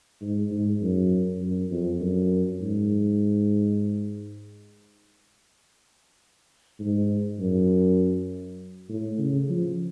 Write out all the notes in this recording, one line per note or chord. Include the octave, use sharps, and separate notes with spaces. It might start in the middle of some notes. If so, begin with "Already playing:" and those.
G#2
G#2
F#2
F#2
F2
F#2
G#2
G#2
F#2
A2
C#3
F3